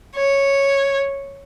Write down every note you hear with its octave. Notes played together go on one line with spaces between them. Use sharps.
C#5